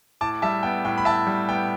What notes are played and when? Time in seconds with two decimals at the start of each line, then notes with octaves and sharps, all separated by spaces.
0.21 A2 A5 D6
0.42 G3 E5 A5
0.63 B3 G5
0.85 A2 G5
0.98 B5
1.05 A2 E5 A5
1.27 G3
1.48 B3 G5